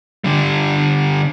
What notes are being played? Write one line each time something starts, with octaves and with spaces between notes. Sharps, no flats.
D3 G3